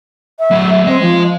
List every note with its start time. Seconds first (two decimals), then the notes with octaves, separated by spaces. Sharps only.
0.39 E5
0.51 F#3 A3
0.85 G#3 C4 D#5
1.01 F3